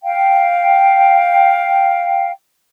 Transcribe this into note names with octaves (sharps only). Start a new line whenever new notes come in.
F5 G5